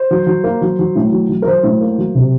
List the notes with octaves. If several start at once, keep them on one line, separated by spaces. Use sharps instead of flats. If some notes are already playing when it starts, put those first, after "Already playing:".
Already playing: C5
F#3
F#3
A#3
F#3
F#3
A2
F#3
F#3
A#4
F#3 C5
A2
A#3
F#3
C3